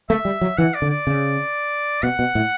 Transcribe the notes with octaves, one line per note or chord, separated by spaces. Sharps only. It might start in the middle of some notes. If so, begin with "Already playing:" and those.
A3 E5
G3
F#3
E3 F#5
D5
D3
D5
C#3
B2 F#5
B2
A2